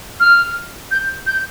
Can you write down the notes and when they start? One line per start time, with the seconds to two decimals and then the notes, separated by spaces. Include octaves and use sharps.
0.20 F6
0.91 G6
1.27 G6